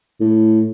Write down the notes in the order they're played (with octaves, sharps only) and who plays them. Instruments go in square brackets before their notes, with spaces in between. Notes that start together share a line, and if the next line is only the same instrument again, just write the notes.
[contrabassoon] A2